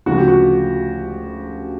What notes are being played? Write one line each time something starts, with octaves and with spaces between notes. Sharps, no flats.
D2 C#3 F3 F#4
G4
F#4